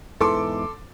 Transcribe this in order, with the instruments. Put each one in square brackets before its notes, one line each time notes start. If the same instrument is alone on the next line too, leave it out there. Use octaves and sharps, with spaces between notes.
[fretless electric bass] E2 G#2 E3 [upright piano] A4 C6 D6